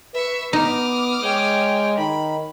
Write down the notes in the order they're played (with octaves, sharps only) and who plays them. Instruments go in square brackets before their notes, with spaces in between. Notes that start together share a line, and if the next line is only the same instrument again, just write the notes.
[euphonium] B4 [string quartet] E5 C#6
[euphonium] B3 [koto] D#4 [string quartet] D6 D#6 F6
[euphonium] G#3 [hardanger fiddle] C#5 G5
[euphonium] D#3 [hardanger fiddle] B5